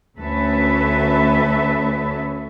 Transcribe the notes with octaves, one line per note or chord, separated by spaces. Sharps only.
D2 C#4 A4 B4 E5